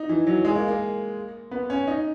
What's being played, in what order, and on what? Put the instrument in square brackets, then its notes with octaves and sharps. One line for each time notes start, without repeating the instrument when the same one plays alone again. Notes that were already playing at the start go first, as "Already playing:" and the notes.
Already playing: [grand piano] D#4
E3
F#3
G#3
A#3
A#3
B3
C#4
D#4